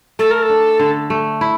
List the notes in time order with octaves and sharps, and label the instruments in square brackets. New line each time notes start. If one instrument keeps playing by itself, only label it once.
[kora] A3 [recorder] A4
[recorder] A#4
A4
[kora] D4
D3
A3
E4